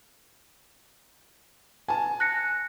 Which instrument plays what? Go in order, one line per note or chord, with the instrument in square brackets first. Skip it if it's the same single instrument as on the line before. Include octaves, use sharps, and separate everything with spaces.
[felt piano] G#5 A5
[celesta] F#6 A#6 C#7